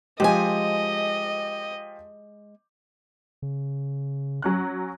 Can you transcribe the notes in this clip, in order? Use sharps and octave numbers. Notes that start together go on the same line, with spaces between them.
F3 G#3 G4 D#5 G#5
C#3
F#3 C#4 F#6